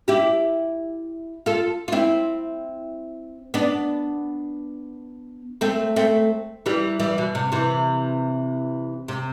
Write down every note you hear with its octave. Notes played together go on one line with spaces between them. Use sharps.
E4 G4
F4 A4
F4
C4 E4
B3 D4
A3 C4
A3 C4
E3 G3
E3 G3
B2
C3
C3 E3
C3